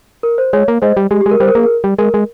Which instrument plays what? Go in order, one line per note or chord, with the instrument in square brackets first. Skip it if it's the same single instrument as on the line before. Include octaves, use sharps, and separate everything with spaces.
[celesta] A#4
C5
[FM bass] G#3 [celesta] C#5
[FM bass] A#3
[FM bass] G#3 [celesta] C5 D#5
[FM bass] G3
[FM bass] G#3 [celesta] G4
[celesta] G4
[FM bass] G#3
[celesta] A#4
[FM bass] G3 [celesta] C5
[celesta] A#4
[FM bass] A#3 [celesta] G#4
[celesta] A#4
[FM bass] G3
[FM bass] G#3 [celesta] A#4
[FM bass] G#3